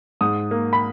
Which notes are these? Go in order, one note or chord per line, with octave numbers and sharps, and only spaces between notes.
G#2 D#6
A#3
B5